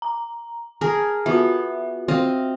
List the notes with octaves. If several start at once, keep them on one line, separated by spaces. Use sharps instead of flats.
A#5
G#4 A#4 A5
B3 F4 F#4 E5
C4 D#5 F5